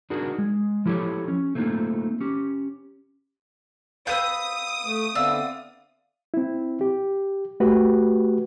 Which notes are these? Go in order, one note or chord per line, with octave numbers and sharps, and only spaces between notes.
D4 D#4 F#4 G#4 A#4
G#3
F3 E4 G4 A4 C#5
C#4
A3 A#3 C4 D4 D#4 F4
C#4 G4
C4 B4 F5 D#6 G6 D#7
A3
D3 B3 C4 D5 E5 F5 E6
C4 E4
G4
A3 F#4 G4 B4